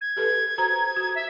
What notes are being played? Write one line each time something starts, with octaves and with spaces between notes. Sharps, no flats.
G#6
G4 A4 B4
F#4 C5 A#5
F#4
E5